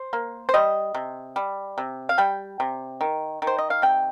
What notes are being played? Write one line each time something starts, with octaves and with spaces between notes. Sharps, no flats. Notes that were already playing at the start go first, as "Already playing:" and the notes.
Already playing: C5
A#3
C5
G3 D#5
C3
G3
C3
F5
G3 G5
C3
D#3
D#3
C5
D#5
F5
C3 G5